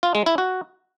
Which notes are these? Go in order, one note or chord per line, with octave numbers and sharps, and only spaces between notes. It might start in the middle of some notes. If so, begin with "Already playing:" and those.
F4
G#3
E4
F#4